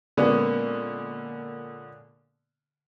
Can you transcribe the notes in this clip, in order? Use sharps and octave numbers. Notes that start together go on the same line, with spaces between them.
A#2 D3 G#3 A#3 B3 C#4